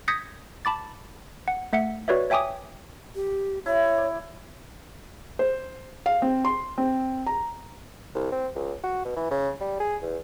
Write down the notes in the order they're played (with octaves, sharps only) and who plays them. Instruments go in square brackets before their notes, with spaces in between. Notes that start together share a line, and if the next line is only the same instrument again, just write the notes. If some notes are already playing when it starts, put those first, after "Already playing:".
[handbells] D#6 G6 G#6 A#6 B6 C#7
A5 B5 D6 A6
F#5
A3 E5 F#5 C#7
F#4 B4 C#5 D5 E5
C#5 E5 G5 G#5 D6 D#6
[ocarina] G4
[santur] E4 [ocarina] C#5
[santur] D5
[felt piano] C5
F5
C4
C6
C4
A#5
[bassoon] C2
C4
C#2
F#4
B2
E3
C#3
G3
G#4
E2